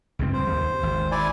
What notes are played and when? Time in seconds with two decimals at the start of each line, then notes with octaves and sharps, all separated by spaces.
0.19 C#2 G2 C4
0.34 C5
0.47 D#2
0.83 G#1
1.11 E4 D5 G#5